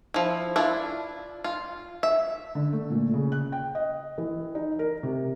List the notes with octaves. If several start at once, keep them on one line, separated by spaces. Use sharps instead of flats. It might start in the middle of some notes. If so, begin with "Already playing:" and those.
F3 E4
D4 E4 F4
F4
E5
D3
A3
A#2
C#3
F#6
G5
D#5
E3
D#4
A#4
C3